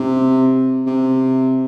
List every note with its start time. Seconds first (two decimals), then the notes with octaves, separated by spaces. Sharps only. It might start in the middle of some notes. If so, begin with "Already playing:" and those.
Already playing: C3
0.86 C3